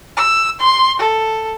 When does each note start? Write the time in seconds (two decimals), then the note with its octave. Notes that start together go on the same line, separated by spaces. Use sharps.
0.17 E6
0.60 C6
0.99 A4